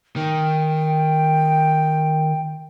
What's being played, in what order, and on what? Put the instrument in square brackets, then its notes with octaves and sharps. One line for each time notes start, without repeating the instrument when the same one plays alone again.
[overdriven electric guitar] D#3 [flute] G5